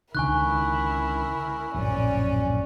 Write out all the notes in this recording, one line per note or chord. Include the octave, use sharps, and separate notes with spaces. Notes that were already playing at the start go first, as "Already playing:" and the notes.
C#2 D3 D#3 E4 A#4 G#5 C#6 F#6
D1 A#1 F#2 C#4 D5